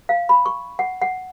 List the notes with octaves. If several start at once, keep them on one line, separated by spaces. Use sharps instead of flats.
F5
B5
C#6
F#5
F#5